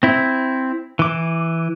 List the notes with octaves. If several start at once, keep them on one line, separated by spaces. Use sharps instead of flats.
C4 E4
E3 D6